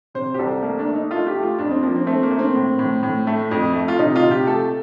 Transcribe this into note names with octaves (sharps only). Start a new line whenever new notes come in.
C3 C5
G4
C2 A4
A3 A#3
D4
A3
D#4
A3 F4
G4
A3
F4
F2 D4
C4
F3 A#3
C4
A3 C4
A#3
A3
C4
A2
A2
A2
A3
F2
A3
F4
C3 D#4
F4
C3
G4
A3 A4